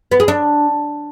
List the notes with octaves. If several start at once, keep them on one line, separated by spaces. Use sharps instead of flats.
B3
G#4
D4